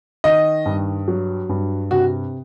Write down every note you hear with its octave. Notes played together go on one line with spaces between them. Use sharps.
D#3 D#5
G2
F#3
G2
C3 F#4